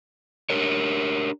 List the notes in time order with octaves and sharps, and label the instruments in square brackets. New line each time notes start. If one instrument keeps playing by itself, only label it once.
[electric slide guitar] D4 G4 A#4 C#5